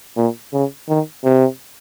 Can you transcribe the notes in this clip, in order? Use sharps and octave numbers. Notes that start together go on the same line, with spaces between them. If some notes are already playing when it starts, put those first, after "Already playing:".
A#2
C#3
D#3
C3